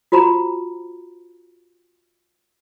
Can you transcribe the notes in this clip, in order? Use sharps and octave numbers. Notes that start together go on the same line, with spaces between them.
F4 F#4 C5 A#5 B5